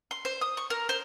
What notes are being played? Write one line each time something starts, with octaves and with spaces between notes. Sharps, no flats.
C6
C5
D#6
C#6
A#4
C5